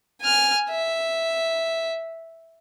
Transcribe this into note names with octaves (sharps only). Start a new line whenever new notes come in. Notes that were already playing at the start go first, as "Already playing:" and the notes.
G#5 F6
E5